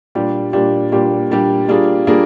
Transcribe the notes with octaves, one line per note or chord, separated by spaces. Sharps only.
A#2 G3 D4 G4
A#2 G3 D4 G4
A#2 G3 D4 G4
A#2 G3 D4 G4
G3 A#3 D4 F4 G#4
G3 A#3 D4 F4 G#4